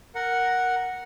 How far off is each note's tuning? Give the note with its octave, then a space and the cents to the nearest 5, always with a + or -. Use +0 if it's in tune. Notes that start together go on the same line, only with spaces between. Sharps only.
A#4 +0 F#5 +0